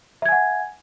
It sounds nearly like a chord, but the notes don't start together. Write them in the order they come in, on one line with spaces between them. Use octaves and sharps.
E5 G#6 G#5 F#5